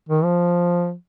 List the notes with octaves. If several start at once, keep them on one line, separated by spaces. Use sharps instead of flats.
D#3
F3